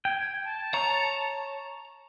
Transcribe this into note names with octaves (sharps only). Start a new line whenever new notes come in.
G5 G#6
A5
C#5 A#5